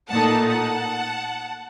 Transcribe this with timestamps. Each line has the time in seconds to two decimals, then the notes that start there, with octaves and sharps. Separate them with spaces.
0.10 A#2 A3 D#4 F#5 A5
0.48 F#5 A5